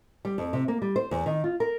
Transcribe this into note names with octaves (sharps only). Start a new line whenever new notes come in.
G3
F2
C3
A#3
G3
C5
E2
D#3
F4
A#4